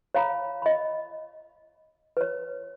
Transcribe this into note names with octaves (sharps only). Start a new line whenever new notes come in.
C#5 F5 A#5 B5
D#5 B5
B4 C#5